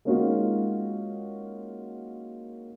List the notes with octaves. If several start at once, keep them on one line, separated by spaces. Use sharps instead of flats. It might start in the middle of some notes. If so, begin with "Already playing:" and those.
G#3 A#3 C#4 D#4 F4 F#4